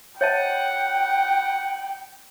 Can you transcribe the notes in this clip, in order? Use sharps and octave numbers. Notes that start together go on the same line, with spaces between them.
C#5 D#5 F#5 G5 A5